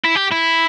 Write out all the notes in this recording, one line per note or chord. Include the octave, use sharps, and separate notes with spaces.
E4
G4
E4